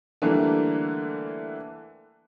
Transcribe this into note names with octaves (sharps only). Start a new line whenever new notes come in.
D3 E3 G3 A3 A#3